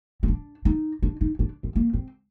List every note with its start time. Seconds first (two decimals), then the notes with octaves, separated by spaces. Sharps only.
0.23 C4
0.28 D4
0.65 D#4
1.02 D4
1.21 D#4
1.39 D4
1.63 C4
1.76 A#3
1.93 C4